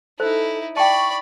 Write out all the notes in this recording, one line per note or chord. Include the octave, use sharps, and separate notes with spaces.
D#4 E4 A4 C5
D5 G5 A5 B5 C#6